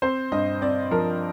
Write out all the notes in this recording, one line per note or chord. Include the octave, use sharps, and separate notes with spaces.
C4 C5
G2 D#5
C4 D5
F3 A#4